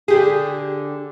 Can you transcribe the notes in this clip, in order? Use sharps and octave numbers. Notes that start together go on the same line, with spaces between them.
D3 G4 G#4